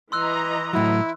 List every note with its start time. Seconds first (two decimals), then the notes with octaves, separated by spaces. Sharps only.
0.12 E3 D#5 A#5 C6 E6 F#6
0.73 A2 F#3 E4